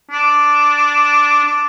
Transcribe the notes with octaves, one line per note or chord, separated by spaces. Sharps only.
D4
D4